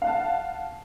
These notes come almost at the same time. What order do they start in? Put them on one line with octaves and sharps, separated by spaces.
F5 F#5 A5